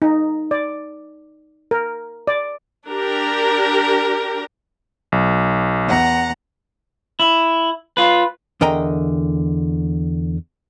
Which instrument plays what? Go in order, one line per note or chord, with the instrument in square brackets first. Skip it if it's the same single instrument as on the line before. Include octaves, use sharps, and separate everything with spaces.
[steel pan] D#4
D5
A#4
D5
[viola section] D4 G4 A#4
[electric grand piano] B1
[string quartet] E2 F#5 A#5
[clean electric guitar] E4
F4 B4
[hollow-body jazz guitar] E2 D3 A#4 D#5 G5 A#5